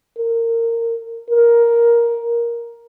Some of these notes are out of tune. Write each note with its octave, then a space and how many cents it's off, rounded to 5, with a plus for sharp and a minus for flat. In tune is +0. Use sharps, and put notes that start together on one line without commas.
A#4 -20
A#4 +10